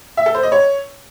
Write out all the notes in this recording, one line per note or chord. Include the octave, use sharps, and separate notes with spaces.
E5
A4
C5
D#5
C#5